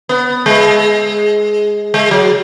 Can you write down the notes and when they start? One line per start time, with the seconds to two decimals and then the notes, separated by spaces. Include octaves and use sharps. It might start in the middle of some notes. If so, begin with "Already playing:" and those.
0.09 B3
0.46 G#3
1.94 G#3
2.11 F#3